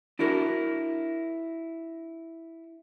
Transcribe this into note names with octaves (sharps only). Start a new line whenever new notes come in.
D4 E4 F#4 A#4